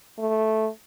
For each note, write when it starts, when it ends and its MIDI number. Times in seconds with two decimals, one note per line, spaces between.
0.19 0.69 57